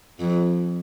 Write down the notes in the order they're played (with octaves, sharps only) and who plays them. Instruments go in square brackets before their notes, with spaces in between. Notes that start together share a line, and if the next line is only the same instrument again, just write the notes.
[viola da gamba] F2